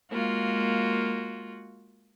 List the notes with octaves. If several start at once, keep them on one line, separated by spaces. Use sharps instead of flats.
G#3 A#3 F4 F#4